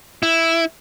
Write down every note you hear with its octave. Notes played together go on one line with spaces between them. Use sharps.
E4